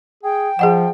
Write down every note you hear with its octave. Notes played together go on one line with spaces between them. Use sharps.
G#4 G5
F3 G#4 D#5 F#5